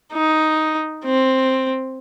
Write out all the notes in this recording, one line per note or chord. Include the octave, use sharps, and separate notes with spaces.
D#4
C4